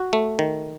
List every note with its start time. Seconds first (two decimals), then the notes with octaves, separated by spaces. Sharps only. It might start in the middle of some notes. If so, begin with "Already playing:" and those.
Already playing: F#4
0.13 A3
0.39 D#3